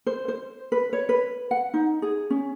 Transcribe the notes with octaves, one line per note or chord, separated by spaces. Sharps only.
C5
C5
B4
C#5
B4
F#5
D#4
G#4
C#4